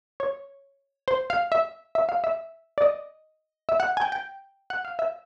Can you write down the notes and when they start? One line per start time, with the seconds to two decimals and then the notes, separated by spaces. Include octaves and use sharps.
0.20 C#5
1.08 C5
1.30 F5
1.52 E5
1.95 E5
2.09 F5
2.24 E5
2.78 D5
2.82 D#5
3.69 E5
3.80 F#5
3.97 G#5
4.01 G5
4.12 G5
4.70 F#5
4.85 F5
4.99 E5